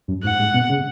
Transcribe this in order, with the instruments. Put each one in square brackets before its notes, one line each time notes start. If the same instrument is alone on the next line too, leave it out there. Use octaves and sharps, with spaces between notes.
[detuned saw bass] F#2
[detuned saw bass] G#2 [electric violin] F#5
[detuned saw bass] G#2
B2
C#3